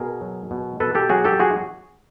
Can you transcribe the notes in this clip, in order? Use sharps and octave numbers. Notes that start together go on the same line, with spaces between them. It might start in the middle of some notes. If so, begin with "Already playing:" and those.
Already playing: B2 G#4 A#4
F#3
B2
B2 A4 B4
G4 A4
F#3 F#4 G#4
G4 A4
F#4 G#4